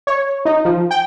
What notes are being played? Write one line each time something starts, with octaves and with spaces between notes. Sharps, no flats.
C#5
D#4
F3
G5